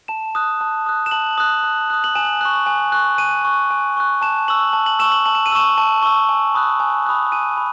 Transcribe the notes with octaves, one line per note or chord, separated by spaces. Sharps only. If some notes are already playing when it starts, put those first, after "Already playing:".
A5 E7
D#6 F#6
A5
D#6 F#6
E7
A5 F#7
D#6 F#6
A5
D#6 F#6
F#7
G#5 E7
C#6 F#6
G#5
C#6 F#6
G#5 D#7
C#6 F#6
G#5
C#6 F#6
A5 E7
C#6 E6 F#7
A5
F#7
C#6 E6 E7
F#7
A5 F#7
E7
D#7
C#6 E6 E7
A5
C#6 E6
G#5
B5 D#6 F#6
G#5
B5 D#6 F#6
G#5 D#7
B5